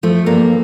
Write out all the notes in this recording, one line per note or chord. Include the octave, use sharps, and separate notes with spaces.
F3 A3
G2 A#3